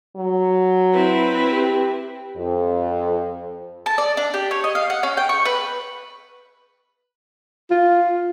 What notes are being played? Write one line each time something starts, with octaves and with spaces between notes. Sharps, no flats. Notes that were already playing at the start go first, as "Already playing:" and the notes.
F#3
C4 E4 B4
G4
F2
A5
D5
D4
G4
C#5
D#5
F5
F#5
C#4
G5
C#6
B4
F4